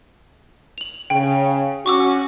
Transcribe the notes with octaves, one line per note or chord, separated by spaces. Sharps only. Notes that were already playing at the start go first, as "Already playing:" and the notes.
F7 F#7
C#3 G5
C#4 F#4 C#6 D6 E6